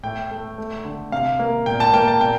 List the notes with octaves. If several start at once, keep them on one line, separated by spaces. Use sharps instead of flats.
A2 G5
A3
A3
D3
C3 F5
A#3
A#2 G5
A5
A#3 G5
A5
A#2 G5